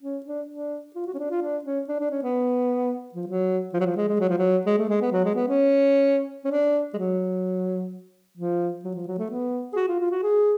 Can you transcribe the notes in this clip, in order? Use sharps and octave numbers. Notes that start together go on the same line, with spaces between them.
C#4
D4
D4
F4
F#4
C#4
D4
F4
D4
C#4
D4
D4
C#4
B3
F3
F#3
F3
F#3
F3
G#3
G#3
F#3
F3
F#3
G#3
A3
G#3
B3
F#3
G#3
B3
C#4
C#4
D4
G#3
F#3
F3
F#3
F3
F#3
A3
B3
G#4
F#4
F4
F4
F#4
G#4